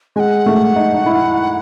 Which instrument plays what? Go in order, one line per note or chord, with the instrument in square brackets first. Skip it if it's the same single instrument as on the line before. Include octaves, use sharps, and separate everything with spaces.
[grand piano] G#3 [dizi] G#5
[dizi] F#5
[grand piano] A3
D#4
D#4
E4